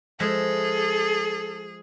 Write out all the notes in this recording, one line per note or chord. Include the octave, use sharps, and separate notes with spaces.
F3 G#3 G#4 A4 E5